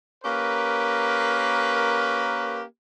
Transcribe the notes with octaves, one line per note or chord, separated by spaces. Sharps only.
A#3 C#4 G4 A#4 B4